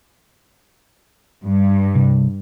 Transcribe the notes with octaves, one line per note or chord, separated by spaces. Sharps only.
G2
C3 G3